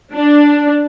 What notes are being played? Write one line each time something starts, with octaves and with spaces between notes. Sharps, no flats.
D4